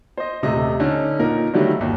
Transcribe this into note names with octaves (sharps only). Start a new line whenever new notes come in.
C5 D#5
D#1 C3 A3 D#5
D3 C#4 D#4
A#2 D#4 A#4
D3 D#3 F#3 G3 A3
G1 D#2